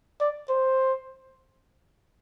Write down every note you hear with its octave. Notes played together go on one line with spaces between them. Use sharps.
D5
C5